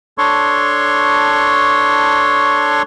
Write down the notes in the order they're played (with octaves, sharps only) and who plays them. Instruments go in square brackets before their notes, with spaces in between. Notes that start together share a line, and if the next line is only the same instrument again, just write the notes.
[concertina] D4 A4 C#5 C6 C#6